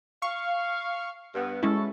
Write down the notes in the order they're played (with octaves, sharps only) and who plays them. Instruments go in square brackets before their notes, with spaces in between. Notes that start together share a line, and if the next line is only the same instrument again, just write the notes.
[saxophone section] F5 [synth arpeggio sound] C#6
[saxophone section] G2 B3
[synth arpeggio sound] G#3 C#4 E4 [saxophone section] F#4 A4